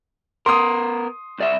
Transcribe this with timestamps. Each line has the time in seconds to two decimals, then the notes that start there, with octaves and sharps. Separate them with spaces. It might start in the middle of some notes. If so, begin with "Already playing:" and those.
0.46 B3 A#4 C6 D#6
1.38 C2 D5 E5